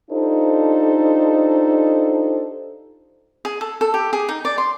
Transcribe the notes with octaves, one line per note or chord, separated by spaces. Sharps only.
D4 D#4 F4 G4 A4 C5
G#4
A4
A4
G4
G#4
D#4
D5
C6